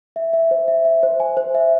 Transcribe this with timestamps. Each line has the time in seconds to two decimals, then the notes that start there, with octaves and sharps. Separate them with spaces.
0.16 E5
0.33 E5
0.51 C5
0.68 E5
0.85 E5
1.03 C5
1.20 G#5
1.37 C5
1.55 E5